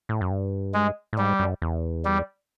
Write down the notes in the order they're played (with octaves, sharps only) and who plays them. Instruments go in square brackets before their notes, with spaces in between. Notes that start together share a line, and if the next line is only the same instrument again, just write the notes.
[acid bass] A2
F#2
G2
[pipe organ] G#3
[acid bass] A2
[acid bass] G#2 [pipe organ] G3
[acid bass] F#2
E2
[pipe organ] G3